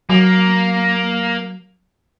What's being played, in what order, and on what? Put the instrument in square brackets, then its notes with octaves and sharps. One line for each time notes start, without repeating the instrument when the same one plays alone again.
[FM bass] F#3 [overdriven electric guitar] A#3